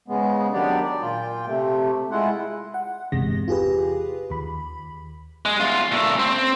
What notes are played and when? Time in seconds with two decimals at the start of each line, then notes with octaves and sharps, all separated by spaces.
0.08 G#2 C#3 G#3 B3
0.53 D#3 F#3 B3 D4 G4 D5
0.83 D5
1.02 A#2 F4 G5
1.46 C3 A3
2.11 G#3 E4 F4 F#5
2.74 F#5
3.12 G1 E2 C3 G#3 A#6
3.48 F4 G4 G#4 B4
4.30 D#2 B5
5.45 G#3
5.60 E2 F4
5.92 A#2 A3
6.19 C4